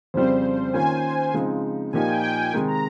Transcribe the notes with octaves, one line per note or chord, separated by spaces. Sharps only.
F2 C#3 G3 C4 C5
D#3 A#3 C#4 F4 G#5
C#3 F3 G#3 C4 D#4
A#2 F3 A#3 D#4 G4 G#5
G5
G5
G#5
C3 D#3 G#3 G#5
A#5